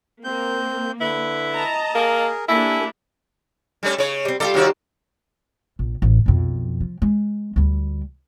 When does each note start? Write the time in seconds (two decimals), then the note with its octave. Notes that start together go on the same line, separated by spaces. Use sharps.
0.24 A#3 C4 G6
1.01 D3 E4 B4
1.54 D#5 A5 A#5
1.95 A#3 G#4 A#4
2.48 A#3 D4 E4 G4 A4 G#5 E6
3.83 G3 A3 C#4
3.98 C#3 C#5
4.25 G3 C4
4.40 G3 F4 G4 A4
4.54 C3 D#3 F#4
5.79 A#1
6.02 A1
6.26 B1 F2
6.81 F3
7.02 G#3
7.56 D2 G3